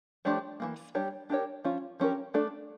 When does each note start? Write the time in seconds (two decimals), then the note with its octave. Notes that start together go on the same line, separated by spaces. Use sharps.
0.25 F3 A3 D4 G4 C#5
0.60 E3 G3 A#3
0.95 G3 D4 G4 C#5
1.30 D4 G4 A#4 C#5
1.65 F3 C#4 F4
2.00 F3 C#4 G4 A#4
2.34 A3 D4 A4